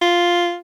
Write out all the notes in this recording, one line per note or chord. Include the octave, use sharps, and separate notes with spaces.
F4